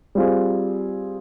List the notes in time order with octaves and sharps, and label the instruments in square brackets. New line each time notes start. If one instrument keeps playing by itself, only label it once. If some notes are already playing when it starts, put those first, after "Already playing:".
[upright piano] G3 C4 F4 G#4